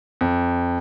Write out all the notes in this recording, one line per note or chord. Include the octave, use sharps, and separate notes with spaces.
F2